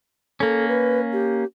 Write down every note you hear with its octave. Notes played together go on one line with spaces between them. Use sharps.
A#3 C#4 A4
B4
G4